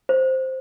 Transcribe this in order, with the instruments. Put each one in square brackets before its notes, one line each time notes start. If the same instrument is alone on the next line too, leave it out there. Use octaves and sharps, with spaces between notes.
[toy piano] C5